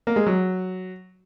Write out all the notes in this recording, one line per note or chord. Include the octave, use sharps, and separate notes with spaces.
A#3
G#3
F#3